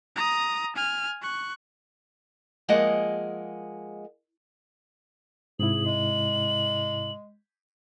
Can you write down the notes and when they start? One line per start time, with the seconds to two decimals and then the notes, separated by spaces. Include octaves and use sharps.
0.16 A#5 D#6
0.75 G#5 F6
1.22 C#6 F#6
2.69 F3 G#3 A#3 G#4 D#5 F#5
5.59 G#2 C3 E4 G#4 F#7
5.85 G#3